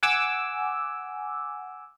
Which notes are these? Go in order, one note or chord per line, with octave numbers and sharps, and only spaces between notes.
F#5 G#5 D6 E6